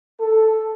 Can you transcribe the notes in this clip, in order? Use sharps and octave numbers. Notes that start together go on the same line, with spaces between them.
A4